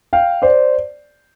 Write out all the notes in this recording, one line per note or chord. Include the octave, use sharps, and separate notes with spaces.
F5 G5
C5 D5